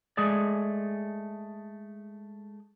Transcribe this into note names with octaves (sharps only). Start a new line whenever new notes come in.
G#3 A3 G#4 D5